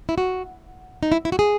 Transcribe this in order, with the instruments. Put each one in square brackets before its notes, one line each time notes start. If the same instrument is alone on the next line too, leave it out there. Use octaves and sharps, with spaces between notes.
[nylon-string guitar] E4
F#4
D#4
E4
E4
F#4
G#4